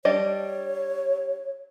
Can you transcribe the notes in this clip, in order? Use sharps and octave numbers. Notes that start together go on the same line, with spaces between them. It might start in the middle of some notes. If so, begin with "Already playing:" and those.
G3 D4 C#5 D#5